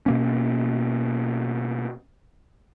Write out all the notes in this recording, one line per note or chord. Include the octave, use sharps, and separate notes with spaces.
B2 A#3 C#4